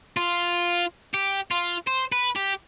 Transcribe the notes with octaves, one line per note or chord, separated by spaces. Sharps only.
F4
G4
F4
C5
B4
G4